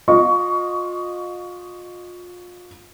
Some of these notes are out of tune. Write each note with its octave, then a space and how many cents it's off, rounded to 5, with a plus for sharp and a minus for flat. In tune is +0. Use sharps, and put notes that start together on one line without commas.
F4 +30 D#5 -15 C#6 +20